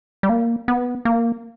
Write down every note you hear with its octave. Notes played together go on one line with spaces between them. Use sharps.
G3
A#3
B3
A#3